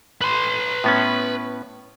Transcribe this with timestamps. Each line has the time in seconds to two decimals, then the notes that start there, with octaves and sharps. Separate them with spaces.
0.21 B4 C6
0.84 A2 B3 C#4